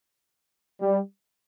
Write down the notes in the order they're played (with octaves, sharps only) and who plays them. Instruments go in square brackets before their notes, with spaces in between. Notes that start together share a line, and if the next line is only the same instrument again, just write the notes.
[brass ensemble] G3